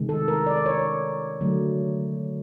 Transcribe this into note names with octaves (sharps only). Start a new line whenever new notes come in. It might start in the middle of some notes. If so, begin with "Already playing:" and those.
Already playing: C3 D#3 G#3
A4
A#4
D5
C#5
D3 F#3 A3